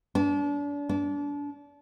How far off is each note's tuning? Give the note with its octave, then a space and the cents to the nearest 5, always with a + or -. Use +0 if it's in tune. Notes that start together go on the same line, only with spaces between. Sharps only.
D4 -35
D4 -30